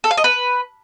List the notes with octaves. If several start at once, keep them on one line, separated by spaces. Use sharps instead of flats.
A4
F5
D#5
B4